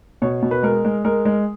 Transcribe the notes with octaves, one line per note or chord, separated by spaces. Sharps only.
B2 C#5
B2
B4
G#3 A#4
G#3
G#3 A#4
G#3